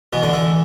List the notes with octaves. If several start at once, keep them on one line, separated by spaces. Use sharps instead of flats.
B2 E3 B3
D3 D4
E3 E4